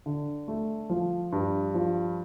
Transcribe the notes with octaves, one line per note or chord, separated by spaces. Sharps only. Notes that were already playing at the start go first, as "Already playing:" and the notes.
D3
A3
F3
G2
F3